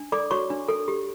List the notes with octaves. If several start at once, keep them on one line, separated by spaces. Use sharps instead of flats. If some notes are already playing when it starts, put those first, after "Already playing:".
Already playing: D4
A4 D5 D6
F#4 C#5 C#6
D4
A4
G4